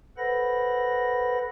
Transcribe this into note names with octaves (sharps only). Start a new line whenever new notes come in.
A4 B4 C5 F#5 B5 A#6